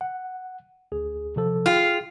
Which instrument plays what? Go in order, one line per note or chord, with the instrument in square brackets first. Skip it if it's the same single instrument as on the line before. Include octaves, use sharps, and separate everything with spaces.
[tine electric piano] F#5
D2 G#4
C3 F3 A4
[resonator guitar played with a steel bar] F4 [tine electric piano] G#4 G5 F6